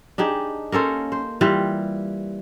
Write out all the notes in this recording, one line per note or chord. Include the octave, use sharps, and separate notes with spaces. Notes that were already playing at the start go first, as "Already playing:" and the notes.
D4 D#4 G4 G#4
A#3 C#4 A4 C5
C5
E3 G3 F4 C5